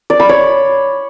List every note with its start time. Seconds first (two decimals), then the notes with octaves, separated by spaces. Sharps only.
0.10 D5
0.20 B5
0.29 C#5